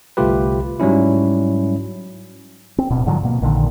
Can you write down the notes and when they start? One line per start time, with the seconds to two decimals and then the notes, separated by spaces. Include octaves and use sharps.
0.17 G1 C2 A3 F4 G4 B4
0.80 G#2 F#3 G3 C#4 E4
2.78 C4
2.90 D1 B2
3.06 G#2 D3 F3 F#3
3.23 B2 A#3
3.41 A#1 A#2 D3 D#3